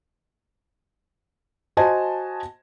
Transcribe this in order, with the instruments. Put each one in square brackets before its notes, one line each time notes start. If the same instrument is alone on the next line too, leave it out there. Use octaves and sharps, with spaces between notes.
[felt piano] F#4 C5 D#5 G#5 A5